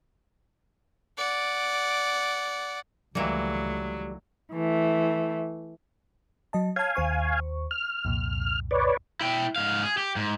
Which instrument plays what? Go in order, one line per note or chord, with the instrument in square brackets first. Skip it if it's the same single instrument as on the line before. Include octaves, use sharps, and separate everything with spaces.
[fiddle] D5 F#5
[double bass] C#2 A3 [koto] D#3 E3 A#3 [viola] F#3 [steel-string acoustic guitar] G3
[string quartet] E3 A3
[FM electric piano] F#3 D#5 A5
[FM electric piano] C#5 A5 [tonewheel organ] F5 G#5
[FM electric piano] D#2 C5 C#6
[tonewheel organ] F6
[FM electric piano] C2 F2 A#2
[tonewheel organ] B4 C#5 D5
[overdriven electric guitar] E4 G5
G#2 F5
G#4
G4
G#2